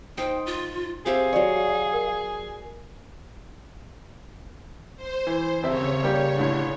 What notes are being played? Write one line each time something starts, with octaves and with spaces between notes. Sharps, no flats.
D#4 C5 G5
F4
C4 G4 G#4 E5 F5
F#3 G4 C#5 D5
A#4
C5
E3
D#1 C#3 C4 C#5 E5
G3 A#3 G4
G1 A2 D3